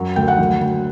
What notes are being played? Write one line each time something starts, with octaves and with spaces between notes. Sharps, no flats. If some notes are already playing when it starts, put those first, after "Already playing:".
Already playing: F#2 F#3
D2 G5
F#5
F#3
D2